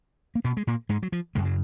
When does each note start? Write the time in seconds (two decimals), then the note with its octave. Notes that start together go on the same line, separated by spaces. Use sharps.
0.35 A#3
0.45 B2 B3
0.57 G#3
0.67 A#2 A#3
0.89 G#2 G#3
1.03 F#3
1.12 F3
1.35 F#2 C#3 G#3
1.45 F#3